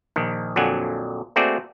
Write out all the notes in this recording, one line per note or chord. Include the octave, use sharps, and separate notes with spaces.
A#1 D#3
A#1 F2 D3 F#3 F#5 G#5
A3 A#3 C4 F#4 G#4 D5